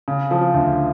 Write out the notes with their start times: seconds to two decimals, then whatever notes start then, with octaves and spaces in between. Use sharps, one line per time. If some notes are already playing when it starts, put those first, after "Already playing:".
0.08 C#3
0.31 F3
0.54 D2